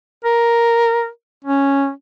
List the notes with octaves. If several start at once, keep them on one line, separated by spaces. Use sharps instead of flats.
A#4
C#4